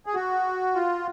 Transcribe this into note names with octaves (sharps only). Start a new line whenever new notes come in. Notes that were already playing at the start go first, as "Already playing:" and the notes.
G#4
F#4
F4